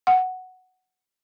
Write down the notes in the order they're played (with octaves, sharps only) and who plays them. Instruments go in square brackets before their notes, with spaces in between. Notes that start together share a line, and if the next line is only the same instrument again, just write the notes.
[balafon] F#5